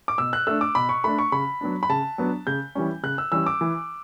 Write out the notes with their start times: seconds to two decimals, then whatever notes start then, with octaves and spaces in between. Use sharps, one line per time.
0.08 D6
0.18 B2 E6
0.33 F#6
0.47 A3 D4 E6
0.61 D6
0.75 B2 B5
0.89 C#6
1.04 A3 D4 B5
1.19 C#6
1.32 C#3 B5
1.61 F#3 B3 D4
1.83 B5
1.89 C#3 A5
2.18 F#3 B3 D4
2.47 C#3 G6
2.75 E3 G3 C#4
3.03 C#3 F#6
3.18 E6
3.32 E3 G3 C#4 E6
3.46 D6
3.61 E3